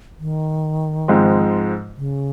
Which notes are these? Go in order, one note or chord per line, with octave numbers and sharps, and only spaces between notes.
D#3
G#2 F3 G#3 C4 F4
C#3